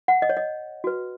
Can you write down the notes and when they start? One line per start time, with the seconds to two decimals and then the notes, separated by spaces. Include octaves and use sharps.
0.08 F#5
0.22 D#5
0.29 C#5
0.37 D#5
0.84 F#4 B4